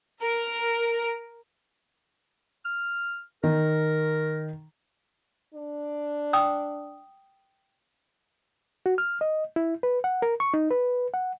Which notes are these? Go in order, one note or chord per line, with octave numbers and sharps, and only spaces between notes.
A#4
F6
D#3 A#4
D4
G5 D#6 E6
F#4
F6
D#5
E4
B4
F#5
A#4
C#6
D#4
B4
F#5